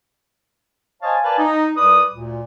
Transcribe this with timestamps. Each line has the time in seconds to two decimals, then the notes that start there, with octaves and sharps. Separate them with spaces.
1.02 C5 C#5 D#5 F5 G#5 A5
1.24 A#4 B4 D5 F5 G#5 A5
1.39 D#4
1.77 C2 B4 D5 D#6
2.12 D2 A#2